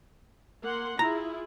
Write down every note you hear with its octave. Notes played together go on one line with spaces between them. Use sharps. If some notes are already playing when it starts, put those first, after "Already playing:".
A#3 F#5 C6
E4 F4 G#4 A#5